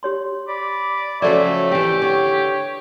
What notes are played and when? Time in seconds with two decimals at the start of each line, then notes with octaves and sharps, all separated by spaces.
0.03 G4 C#5 C6
0.48 D5 B5
1.22 C#3 F3 F#3 A3 F#4 A4 D5 E5
1.71 E3 C4 G4
2.02 D3 C#5